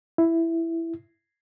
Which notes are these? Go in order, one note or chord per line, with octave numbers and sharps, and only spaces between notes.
E4